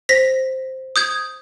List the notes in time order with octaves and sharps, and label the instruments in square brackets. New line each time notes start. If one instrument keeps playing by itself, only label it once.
[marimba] C5 [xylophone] A#6 B6
[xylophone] D#6 G6 G#6